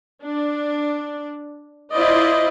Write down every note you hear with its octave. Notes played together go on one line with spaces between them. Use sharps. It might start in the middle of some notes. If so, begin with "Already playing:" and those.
D4
E4 F4 C5 D5 D#5